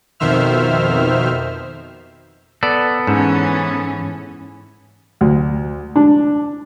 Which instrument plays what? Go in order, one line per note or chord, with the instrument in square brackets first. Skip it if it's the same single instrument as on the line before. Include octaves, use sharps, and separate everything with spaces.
[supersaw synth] F2 B2 D#3 C5 E5 F6
[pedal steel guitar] B3 A4 [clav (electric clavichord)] D5
[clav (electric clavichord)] G#2 [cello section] E3 C#4
[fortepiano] D2
D4